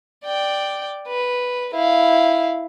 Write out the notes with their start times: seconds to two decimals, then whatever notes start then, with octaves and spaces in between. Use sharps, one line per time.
0.24 D5 G5
1.07 B4
1.74 E4 F5